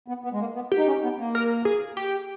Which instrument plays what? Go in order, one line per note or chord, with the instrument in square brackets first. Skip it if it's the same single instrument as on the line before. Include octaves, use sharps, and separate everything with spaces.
[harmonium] B3
B3
G#3
A#3
B3
[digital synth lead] G4
[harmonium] D#4
C#4
B3
A#3
[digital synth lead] A#4
G#4
G4